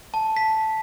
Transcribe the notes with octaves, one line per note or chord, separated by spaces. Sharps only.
A5
B6